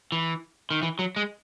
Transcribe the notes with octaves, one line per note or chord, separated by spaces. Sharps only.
E3
D#3
E3
F#3
G#3